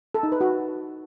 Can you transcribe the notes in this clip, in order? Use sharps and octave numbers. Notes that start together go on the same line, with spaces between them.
A4
D#4
B4
F#4